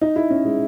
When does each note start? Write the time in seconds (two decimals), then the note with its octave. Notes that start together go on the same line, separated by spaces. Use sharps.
0.01 D#4
0.16 E4
0.30 C#4
0.45 G#3